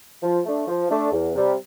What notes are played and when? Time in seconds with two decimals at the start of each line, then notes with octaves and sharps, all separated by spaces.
0.22 F3
0.45 A3 D4
0.68 F3
0.90 A3 D4
1.12 E2
1.35 C3 G3